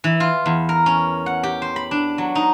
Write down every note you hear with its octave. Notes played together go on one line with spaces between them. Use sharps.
E3
F4
E2
A#4
C#4
F#5
G4
C5
B5
D4
F#3
D#4